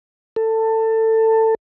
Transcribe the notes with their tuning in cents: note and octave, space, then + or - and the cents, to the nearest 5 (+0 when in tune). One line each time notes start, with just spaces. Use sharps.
A4 +20